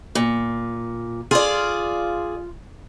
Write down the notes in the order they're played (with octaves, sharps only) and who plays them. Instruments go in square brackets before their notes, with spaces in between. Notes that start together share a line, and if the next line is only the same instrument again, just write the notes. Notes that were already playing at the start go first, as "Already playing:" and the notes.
[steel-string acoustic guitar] A#2
[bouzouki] F4 [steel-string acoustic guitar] G#4 D5